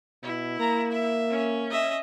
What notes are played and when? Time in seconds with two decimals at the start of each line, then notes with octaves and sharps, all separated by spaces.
0.23 B2 E4
0.60 A#3 A#5
0.91 E5
1.30 C#4
1.70 D#5 E5